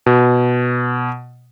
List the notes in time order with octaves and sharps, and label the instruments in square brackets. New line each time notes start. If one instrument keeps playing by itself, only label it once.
[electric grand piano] B2